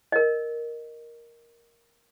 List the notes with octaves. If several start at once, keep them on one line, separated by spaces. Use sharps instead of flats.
A#4 D#5